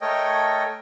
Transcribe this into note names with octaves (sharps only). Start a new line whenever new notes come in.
A3 A4 A#4 C#5 D#5 G5